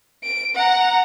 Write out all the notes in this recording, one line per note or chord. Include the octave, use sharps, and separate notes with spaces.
D7
F#5 A#5